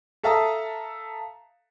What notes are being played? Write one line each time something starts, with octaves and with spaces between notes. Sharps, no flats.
A4 E5 F5 A5 A#5 D#6